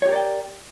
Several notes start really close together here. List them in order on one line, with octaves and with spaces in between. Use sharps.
C#5 G4 A#4 D5 G5